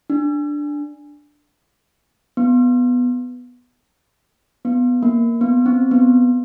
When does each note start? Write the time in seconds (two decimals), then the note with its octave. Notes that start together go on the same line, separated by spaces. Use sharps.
0.10 D4
2.37 B3
4.65 B3
5.03 A#3
5.41 B3
5.66 C4
5.91 B3